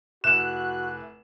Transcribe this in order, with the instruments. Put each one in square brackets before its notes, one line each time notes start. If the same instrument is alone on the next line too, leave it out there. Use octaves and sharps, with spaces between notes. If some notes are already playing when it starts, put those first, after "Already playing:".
[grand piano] F1 E4 [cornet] F#4 [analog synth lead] F#6 [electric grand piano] E7